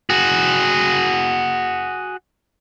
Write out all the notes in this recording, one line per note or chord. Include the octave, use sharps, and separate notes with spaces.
F#4 G#4